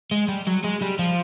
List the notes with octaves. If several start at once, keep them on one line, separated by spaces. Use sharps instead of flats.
G#3
G3
F#3
G#3
G3
F3